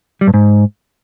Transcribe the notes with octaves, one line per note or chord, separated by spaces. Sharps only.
G3
G2
G#2